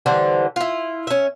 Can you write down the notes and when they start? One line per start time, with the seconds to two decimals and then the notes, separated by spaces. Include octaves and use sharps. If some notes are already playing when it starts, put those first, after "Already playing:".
0.06 D3 E3 G3 C5
0.56 E4 F4
1.07 C#4 E5